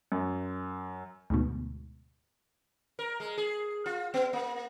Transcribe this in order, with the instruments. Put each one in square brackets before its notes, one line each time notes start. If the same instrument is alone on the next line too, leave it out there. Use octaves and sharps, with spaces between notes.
[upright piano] F#2
[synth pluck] D2 G#2 B2
[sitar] A#4
G#3
G#4
F4
B3
A#3